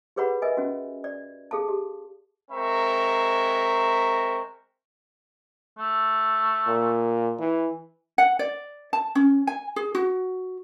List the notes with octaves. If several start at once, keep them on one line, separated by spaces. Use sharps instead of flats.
G4 G#4 B4 C#5 F#5 B5
A#4 B4 D#5 E5 G#5
C#4 F#4
D5
G#4 A4 F5 A5
G4
G#3 C4 A#4 E5 A#5 C#6
A3
A#2
E3
F#5
D5
A5
C#4
G#5
G#4
F#4